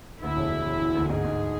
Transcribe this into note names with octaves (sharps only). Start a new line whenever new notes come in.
D2 E4
E1
E1
E1
E1
D2
G#2 G#4
G#2